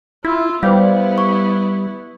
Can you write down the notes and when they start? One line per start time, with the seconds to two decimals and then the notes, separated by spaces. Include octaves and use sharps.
0.25 E4 F4 E6
0.63 G3 B3 E4 B4 C5 F5
1.18 C#6